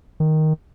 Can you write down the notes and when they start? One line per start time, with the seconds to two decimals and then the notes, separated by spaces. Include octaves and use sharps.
0.20 D#3